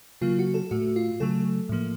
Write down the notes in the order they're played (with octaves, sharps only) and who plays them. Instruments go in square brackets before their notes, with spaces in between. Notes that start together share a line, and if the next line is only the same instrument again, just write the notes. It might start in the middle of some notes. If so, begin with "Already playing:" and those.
[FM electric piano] C#3 F#3 A#3 F4
F#4
A4
A2 A3 F#4
F4
C#3 F#3 A3 A4
A2 F3 A#3